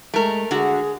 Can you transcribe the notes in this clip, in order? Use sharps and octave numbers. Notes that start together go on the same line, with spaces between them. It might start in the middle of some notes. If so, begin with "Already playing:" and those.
G#3 A3 A#4
D3 F#4 G#4